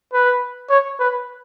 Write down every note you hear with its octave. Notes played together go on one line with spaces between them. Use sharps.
B4
C#5
B4